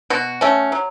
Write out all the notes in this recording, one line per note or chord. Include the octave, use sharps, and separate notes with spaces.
B2 F#4
A3 C#4
F#3